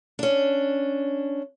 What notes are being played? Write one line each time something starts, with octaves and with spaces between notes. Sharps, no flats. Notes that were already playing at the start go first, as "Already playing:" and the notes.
C#4 D4